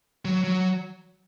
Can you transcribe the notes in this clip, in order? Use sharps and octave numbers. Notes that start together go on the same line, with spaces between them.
F#3
F#3